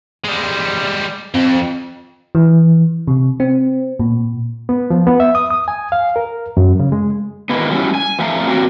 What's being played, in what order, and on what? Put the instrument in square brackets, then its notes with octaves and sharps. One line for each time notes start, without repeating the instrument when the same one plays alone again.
[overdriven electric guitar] G3 G#3
[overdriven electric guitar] F2 [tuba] C4
[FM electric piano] E3
C3
C4
A#2
[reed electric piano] B3
F3
B3
E5
D#6
D#6
G#5
F5
A#4
F#2
C#3
G#3
[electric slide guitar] D#3 E3 G#3 A#3 B3
F#3 G3 C4 C#4 E4
G#5
F2 A2 A3 E5 F5 A#5
F#3 A#3 C4 C#4 F#4 G4